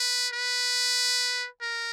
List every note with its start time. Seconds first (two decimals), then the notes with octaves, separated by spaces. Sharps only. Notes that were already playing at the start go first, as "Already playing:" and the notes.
Already playing: B4
0.33 B4
1.62 A#4